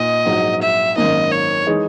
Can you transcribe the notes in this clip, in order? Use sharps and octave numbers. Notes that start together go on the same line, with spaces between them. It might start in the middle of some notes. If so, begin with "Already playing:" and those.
Already playing: A#2 D#4 D#5
A#1 G#2 F#3
E5
G#1 F#2 D#3 A#3 D#4 D#5
C#5
E3 G#3 D#4 G#4